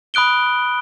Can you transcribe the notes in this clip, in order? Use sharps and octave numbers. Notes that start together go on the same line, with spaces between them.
B5 D#6 F#6 D7 G7